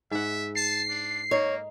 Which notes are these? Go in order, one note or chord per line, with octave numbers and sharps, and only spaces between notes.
G#2 E5 F#5
A5 C7
D4
A#3 D#4 C#5